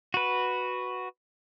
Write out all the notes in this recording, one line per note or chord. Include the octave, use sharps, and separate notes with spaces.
F#4 B4